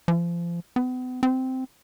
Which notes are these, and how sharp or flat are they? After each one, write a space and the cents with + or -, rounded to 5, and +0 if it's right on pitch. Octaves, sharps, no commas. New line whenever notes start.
F3 -30
B3 +40
C4 -10